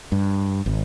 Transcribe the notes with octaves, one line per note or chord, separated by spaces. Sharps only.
G2
G#1